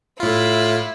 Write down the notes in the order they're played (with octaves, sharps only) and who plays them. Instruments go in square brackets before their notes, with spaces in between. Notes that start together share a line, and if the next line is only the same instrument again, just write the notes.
[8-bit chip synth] A2 F4 [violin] E4